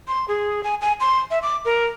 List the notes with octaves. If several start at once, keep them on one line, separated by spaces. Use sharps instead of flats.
C6
G#4
G#5
G#5
C6
E5
D6
A#4